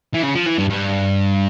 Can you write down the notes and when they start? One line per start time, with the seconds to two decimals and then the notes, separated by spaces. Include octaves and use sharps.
0.14 E3
0.23 C#3
0.35 F3
0.46 E3
0.58 G2
0.70 G2